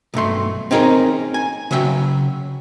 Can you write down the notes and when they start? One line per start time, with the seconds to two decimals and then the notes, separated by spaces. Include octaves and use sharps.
0.14 B1 G2 A3 C6
0.71 C4 C#4 D#4 G#4 A#4
1.34 G#5
1.71 C#3 F#3 E5 G5